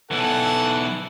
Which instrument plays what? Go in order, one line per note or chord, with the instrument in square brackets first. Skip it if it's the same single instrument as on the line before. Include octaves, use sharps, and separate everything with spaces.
[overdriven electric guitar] B1 E3 [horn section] A4 F#5